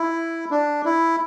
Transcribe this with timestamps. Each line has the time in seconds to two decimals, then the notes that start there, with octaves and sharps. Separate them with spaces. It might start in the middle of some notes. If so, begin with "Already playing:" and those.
Already playing: E4
0.51 D4
0.85 E4